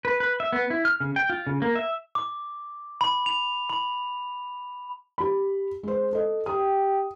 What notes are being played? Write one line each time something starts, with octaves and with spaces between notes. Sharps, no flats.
B4
B4
E5
B3
E4
F6
C#3
G5
F4
C#3
A#3
E5
D6
B5
F7
B5
G4 B5
G#3 C5
A4 D#5
G4 D#6